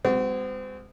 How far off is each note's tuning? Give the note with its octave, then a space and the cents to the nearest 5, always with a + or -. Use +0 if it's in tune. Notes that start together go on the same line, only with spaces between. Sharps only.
G#3 -35 C4 -35 F#4 +5